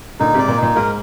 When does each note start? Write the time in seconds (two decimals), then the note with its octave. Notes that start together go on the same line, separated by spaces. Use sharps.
0.20 A#2 D3 D#4
0.34 G#2 C3 D5
0.48 A#2
0.57 D#4
0.62 A#2
0.76 G#2 A#4